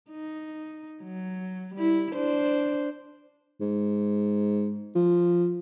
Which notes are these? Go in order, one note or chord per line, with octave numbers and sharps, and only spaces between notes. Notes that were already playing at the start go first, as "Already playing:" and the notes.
D#4
F#3
G3 E4
D4 C5
G#2
F3